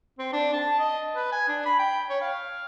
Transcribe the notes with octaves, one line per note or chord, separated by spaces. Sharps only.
C4
D4
A5
D#5
B4
G#5
D4
B5
G5
C#5
F5